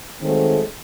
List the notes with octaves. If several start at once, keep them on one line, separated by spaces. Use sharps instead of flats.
D#3 F#3 G#3 A3 C4